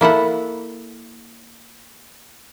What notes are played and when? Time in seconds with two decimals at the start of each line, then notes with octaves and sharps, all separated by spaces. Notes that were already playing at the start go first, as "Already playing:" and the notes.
0.01 A#3 E4 A4 F#5